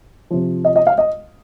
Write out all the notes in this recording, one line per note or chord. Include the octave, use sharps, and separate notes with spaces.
C3 F3
D#5
D#5
F5
D#5